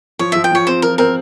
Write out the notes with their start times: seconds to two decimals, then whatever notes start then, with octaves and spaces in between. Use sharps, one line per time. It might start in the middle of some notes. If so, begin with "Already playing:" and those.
0.19 F3 C#5
0.32 F3 E5
0.44 G5
0.52 F3 C#5
0.67 C4 C5
0.82 F3 A#4
0.98 C4 A#4